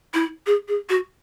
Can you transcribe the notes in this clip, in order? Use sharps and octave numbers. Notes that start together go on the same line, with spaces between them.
E4
G#4
G#4
F#4